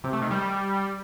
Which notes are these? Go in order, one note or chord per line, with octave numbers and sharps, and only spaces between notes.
C3
A3
D#3
G3